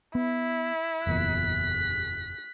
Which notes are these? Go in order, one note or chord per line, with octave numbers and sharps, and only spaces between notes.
B3 E4
F#1 E2 A#2 F#6 B6